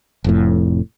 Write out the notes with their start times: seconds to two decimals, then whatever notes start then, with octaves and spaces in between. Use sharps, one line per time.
0.24 F1 F2 A2